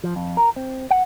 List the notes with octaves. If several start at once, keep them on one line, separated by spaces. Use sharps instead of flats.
F3
F2
A#4
C4
F#5